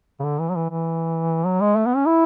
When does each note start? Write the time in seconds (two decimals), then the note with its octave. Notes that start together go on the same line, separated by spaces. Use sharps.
0.20 C#3
0.24 D3
0.39 E3
0.49 F#3
0.56 E3
0.70 E3
1.45 F#3
1.61 G#3
1.76 A3
1.86 B3
1.96 C#4
2.06 E4